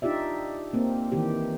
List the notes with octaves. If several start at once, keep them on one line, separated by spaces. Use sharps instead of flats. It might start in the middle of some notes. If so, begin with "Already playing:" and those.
D4 D#4 F4 G4 D5 E5
A#3 C4
D#3 E3 G4